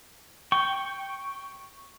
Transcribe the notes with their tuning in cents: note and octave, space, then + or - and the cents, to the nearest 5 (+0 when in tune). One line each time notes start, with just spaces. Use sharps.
G5 +0 C#6 +0